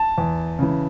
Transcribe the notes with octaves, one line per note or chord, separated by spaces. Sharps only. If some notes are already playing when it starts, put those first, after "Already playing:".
Already playing: A5
E2
C#3 E3